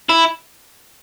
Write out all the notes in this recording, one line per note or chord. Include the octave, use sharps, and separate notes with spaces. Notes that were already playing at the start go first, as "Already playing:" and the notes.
E4